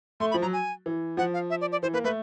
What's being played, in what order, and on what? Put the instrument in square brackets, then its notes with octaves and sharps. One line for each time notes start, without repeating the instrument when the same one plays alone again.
[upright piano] A3 [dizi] C6
[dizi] B5
[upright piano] F3
[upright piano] F#3 [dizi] A#5
[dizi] G#5
[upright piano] E3
[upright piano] F3 [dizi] F#5
[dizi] F5
E5
D5
D5
[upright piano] E3 [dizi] C5
[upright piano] A#3 [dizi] B4
[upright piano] A3 [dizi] B4